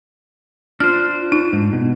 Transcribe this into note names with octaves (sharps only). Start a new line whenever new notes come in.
D4 F4 C5 F6
F4
D#4
G#2 D4
B2